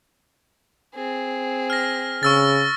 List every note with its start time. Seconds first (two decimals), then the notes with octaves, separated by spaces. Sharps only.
0.95 C4 G#4
1.70 F6 A#6
2.23 C#3 C#6 E6 A6